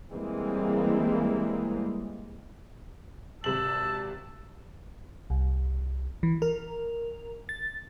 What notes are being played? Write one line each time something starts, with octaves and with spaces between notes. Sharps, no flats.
E3 G3 G#3 A#3 C4
G#1 C3 A5 E6 F#7
C2
E3
A#4
A6